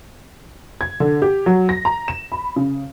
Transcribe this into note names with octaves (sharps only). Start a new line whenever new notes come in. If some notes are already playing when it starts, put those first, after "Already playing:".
G#6
D3
G4
F#3
A#6
A#5
E7
B5
C#3